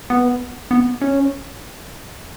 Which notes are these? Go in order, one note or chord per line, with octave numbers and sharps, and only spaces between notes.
B3
B3
C#4